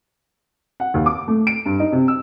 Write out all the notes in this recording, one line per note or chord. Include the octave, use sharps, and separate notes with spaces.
F#5
D#2
D6
A3
D7
G2
D#4
C3
E6